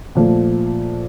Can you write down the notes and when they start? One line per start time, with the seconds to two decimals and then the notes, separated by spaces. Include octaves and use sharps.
0.15 A#2 F3 A3